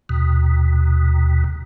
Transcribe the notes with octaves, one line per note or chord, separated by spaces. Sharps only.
D#2 B2